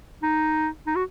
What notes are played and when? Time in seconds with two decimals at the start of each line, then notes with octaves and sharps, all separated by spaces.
0.23 D#4
0.87 D#4
0.96 F#4